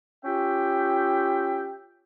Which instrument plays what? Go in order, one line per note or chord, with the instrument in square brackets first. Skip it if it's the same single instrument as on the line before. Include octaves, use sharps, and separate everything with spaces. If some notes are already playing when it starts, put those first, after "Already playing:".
[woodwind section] C#4 F4 G4 E5 G5